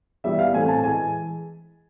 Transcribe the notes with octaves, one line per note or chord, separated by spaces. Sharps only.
E3 G3 B3 E5
F5
A2 E3 A3 C4 G#5
G#5
A5
E3 G#3 G#5